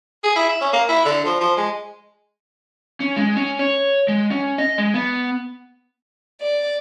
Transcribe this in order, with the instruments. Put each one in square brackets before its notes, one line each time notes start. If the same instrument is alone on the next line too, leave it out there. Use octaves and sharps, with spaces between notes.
[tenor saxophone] G#4
E4
E5
C#4
A#3
E4
D3
F3
F3
G#3
[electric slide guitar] C#4
G#3
C#4
C#5
G#3
C#4
D#5
G#3
B3
[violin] D5